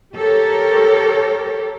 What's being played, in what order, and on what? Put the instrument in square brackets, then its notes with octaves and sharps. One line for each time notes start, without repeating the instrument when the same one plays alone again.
[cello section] G4 A4 A#4 C#5